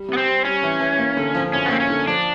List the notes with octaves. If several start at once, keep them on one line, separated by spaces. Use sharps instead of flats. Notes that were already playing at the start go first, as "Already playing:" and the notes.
Already playing: G3
C3 B3
C4
G3
G3 C#4
E3
E3
A#3
D3
F3
F#2 C#4
B3
A#3 C4
C#4
D3
F3 D4